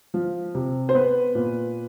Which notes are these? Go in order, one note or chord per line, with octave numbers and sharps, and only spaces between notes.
F3
C3
C5
B3 B4
A#2